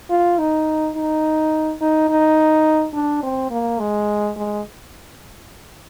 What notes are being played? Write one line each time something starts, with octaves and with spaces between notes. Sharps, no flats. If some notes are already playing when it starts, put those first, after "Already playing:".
F4
D#4
D#4
D#4
D#4
D4
C4
A#3
G#3
G#3